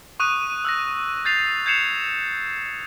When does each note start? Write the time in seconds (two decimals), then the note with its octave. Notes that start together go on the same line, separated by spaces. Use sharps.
0.20 C#6 D#6 F#6 D#7
0.65 E6 F#6 A#6
1.25 G6 A6 C7 F7
1.66 G6 G#6 C7 C#7 E7 F7